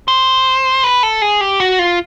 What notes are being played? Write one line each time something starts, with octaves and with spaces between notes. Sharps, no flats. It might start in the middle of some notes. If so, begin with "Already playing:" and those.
C5
B4
A4
G#4
G4
F#4
F4